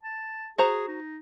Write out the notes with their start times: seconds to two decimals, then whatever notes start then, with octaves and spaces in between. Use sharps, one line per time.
0.03 A5
0.58 F#4 G#4 C5 A#5
0.88 D#4